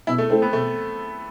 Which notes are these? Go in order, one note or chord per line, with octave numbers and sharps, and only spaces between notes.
B2 E4
A3
A3 C4 E4 A4
B3
B2 A3